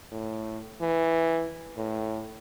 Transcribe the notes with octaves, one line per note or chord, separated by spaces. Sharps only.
A2
E3
A2